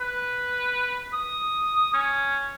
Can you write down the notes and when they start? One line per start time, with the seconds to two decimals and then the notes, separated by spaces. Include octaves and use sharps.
0.01 B4
1.13 D#6
1.94 C#4